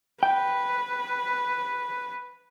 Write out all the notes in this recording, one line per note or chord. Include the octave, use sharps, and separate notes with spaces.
B4 G5